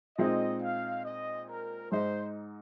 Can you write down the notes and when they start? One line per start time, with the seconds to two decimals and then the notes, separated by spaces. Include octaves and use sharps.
0.18 A#2 G#3 C4 D#4 D#5
0.62 F5
1.05 D#5
1.49 A#4
1.91 G#2 G#3 D#4 C5